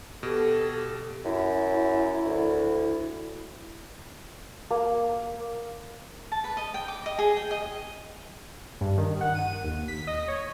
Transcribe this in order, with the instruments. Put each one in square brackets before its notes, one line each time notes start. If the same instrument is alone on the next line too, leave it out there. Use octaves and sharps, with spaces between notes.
[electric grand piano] B2 [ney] G4 [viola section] A4
[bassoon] F#2 [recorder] E4
[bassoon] D2
[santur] A#3
[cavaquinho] A5
B4
D#5
G5
D6
D#5
G#4
G5
D#5
[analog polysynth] G2
D#3
F#5
D#7
D#2
B6
D#5
C#5